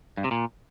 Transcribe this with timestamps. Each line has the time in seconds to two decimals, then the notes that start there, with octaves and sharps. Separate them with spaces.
0.17 G2
0.24 C3
0.31 A#2